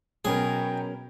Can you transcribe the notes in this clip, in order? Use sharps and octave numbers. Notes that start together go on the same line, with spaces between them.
B2 F#3 C#4 G#4 A#4 G5